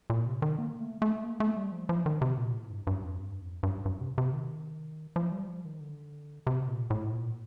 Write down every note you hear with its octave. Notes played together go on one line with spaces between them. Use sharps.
A#2
C3
D#3
A#3
A3
A3
A#3
A3
G3
F3
F3
D#3
C3
A#2
A2
G2
G2
F2
G2
F2
G2
G2
C3
C3
D#3
F3
G3
F3
D#3
D3
C3
A#2
A2
A#2